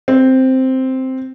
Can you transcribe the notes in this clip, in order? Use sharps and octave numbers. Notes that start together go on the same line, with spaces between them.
C4